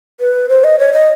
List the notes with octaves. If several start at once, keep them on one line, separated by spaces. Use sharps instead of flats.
B4
C5
D#5
C#5
D#5